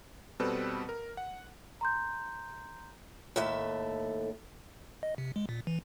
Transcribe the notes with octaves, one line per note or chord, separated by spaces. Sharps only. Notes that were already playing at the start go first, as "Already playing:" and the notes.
B2 G3 C4 A4 B4
A#4
F#5
A#5 C6 G6
D#2 A2 A4 E5
D#5
C3
G#3
A#2
E3